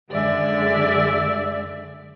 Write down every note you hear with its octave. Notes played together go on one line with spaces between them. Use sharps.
F#2 D3 G#3 D5 E5